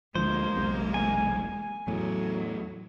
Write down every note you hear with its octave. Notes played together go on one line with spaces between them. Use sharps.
D2 D3 F3 G#3 A#3 C5
E1 B1 C3
G#5
E2 A2 F#3